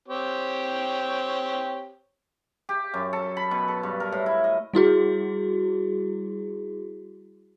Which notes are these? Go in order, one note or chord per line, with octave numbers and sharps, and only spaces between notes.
C4 G4 C#5
G4
F#2
A4
B5
B2
A4
G2
A#4
A2
E4
D#5
G3 E4 F#4 G#4